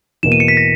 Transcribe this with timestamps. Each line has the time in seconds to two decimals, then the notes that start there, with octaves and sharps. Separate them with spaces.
0.23 E2 B2 A#3 E7
0.32 D#7
0.40 C#7
0.48 B6
0.57 A#6